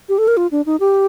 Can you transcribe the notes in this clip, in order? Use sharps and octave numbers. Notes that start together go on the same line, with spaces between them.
G4
A4
A#4
F4
D4
D#4
G4